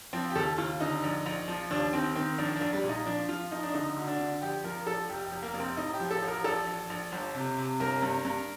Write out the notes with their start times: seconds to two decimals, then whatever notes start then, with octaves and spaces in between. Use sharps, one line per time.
0.13 F3 C4
0.30 G4
0.36 D#2 A4
0.58 D#2 F4
0.80 D3 D#4
1.03 A#1
1.26 A#1
1.48 F3
1.71 D#2 D4
1.93 D#3 C4
2.16 D#3 C4
2.38 A#1 D4
2.56 D4
2.61 A#1
2.73 G3
2.83 A#2
2.89 D#4
3.06 F3 D4
3.29 F3 F4
3.51 F3 D#4
3.63 D4
3.74 D3 D#4
3.96 D2
4.08 D4
4.19 D3
4.42 A#1 G4
4.64 F3 A#4
4.86 A#1 A4
5.09 F1 G4
5.26 G4
5.32 F1
5.42 A#3
5.54 F1
5.60 C4
5.77 A2 D#4
5.94 G4
6.00 F3
6.11 A4
6.22 A1
6.28 A#4
6.44 A#1 A4
6.67 A#1
6.90 A#1
7.12 G1
7.35 C3
7.58 C3
7.80 G1 A#4
8.02 G2
8.25 G2